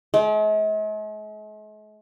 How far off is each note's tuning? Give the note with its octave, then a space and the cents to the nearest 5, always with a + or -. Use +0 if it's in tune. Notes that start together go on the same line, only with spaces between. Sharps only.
G#3 +45